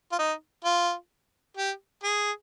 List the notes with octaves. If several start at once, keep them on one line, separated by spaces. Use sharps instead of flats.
F4
D#4
F4
G4
G#4